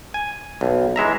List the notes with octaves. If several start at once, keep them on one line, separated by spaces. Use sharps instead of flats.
G#5
B1
E3 G#3 E5 A#5